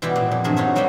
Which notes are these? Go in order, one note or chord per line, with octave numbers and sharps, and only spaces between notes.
B2 E3 G3 B3 E4 G4
A#2
F2
G2 C3 E3 G#4 A#4
D#4 F4 F#4 C#5 E5
G3 A#3 B3 F#4 E5 G5